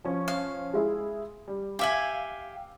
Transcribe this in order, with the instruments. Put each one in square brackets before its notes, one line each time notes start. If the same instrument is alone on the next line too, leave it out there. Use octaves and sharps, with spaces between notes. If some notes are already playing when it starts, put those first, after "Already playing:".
[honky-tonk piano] F3 C#4
[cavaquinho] F5
[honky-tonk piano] G#3 E4 G#4
G3
[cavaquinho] G4 E5 G#5 [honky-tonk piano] F5 F#7